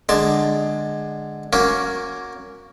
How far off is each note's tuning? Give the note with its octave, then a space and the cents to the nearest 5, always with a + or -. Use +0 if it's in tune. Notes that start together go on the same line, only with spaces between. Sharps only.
D3 +15 G#3 +0 A5 +0
A#3 +0 C#4 +0 F#4 -20